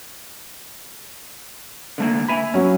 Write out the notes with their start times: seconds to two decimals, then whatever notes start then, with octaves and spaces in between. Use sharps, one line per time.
1.98 D3 A3 A#3
2.28 E5 G#5 B5
2.54 F#3 C#4